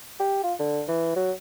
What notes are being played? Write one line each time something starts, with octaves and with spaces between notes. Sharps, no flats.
G4
F4
D3
E3
F#3